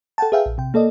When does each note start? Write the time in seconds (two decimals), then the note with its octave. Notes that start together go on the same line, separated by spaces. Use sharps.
0.18 A4 F#5 G5 A5
0.32 G#4 B4 E5 F5 G5
0.46 A#1
0.58 C3 G5
0.74 A#3 A4 D5 D#5